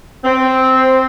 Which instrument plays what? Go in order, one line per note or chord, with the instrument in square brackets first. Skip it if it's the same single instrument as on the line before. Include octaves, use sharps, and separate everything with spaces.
[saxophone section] C4